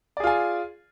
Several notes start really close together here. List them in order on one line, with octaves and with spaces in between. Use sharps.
D5 G#4 F4 G#5